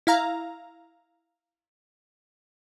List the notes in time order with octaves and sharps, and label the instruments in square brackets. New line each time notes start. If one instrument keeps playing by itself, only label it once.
[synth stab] E4 F5 A#5